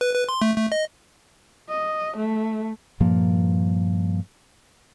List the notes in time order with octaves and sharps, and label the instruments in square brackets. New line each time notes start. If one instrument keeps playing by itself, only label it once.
[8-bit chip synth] B4
B4
C6
A3
A3
D#5
[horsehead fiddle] D#5
A3
[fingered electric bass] G2 A#2 F3 A#3